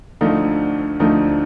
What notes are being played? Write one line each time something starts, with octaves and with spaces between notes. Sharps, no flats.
D2 D3 F3 A3 D#4
D2 D3 F3 A3 D#4